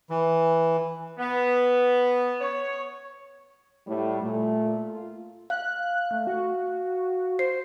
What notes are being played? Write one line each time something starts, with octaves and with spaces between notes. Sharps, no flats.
E3
B3
C#5
A2 G3
A#2 A3
F4
F5 F#6
A3
F#4
C5 C7